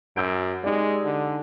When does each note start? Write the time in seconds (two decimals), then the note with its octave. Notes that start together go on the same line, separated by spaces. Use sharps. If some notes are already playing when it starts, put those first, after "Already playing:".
0.16 F#2 E6 G6 D7
0.64 G#3 D#4 G4 D5
1.04 D3